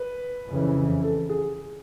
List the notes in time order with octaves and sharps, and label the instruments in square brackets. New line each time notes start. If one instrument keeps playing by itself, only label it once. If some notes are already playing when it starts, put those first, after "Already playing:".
Already playing: [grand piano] B4
[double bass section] F2 C#3 E3
[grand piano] A4
G#4